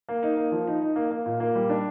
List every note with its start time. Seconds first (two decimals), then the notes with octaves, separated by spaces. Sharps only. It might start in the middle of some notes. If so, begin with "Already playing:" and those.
0.09 A#3
0.23 D#4
0.37 A#3
0.52 F3
0.67 D#4
0.82 D#4
0.96 A#3
1.11 A#3
1.26 A#2
1.40 A#3
1.55 G3
1.70 D4